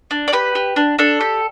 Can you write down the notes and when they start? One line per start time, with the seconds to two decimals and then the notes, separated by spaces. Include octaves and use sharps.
0.11 D4
0.28 D5
0.33 G4 B4
0.55 G4
0.76 D4
0.99 D4 A4
1.21 G4